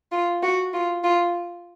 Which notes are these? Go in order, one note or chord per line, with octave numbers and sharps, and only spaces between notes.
F4
F#4
F4
F4